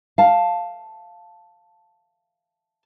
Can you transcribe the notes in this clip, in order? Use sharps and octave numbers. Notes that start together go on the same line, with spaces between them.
F5 A5